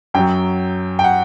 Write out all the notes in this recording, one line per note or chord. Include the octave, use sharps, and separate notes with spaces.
F#2 F#3 G5
G5
F#5